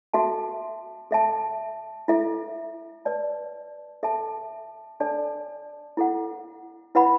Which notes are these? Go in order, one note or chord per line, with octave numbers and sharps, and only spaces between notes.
F#4 A4 E5 A5
A4 E5 A5
E4 A4 E5
B4 D5 A5
A4 E5 A5
D4 A4 D5 A5
E4 A4 F#5
E4 B4 F#5 B5